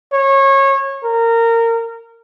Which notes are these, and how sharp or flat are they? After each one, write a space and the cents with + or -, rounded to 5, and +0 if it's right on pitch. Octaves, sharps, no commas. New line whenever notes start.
C#5 -25
A#4 -20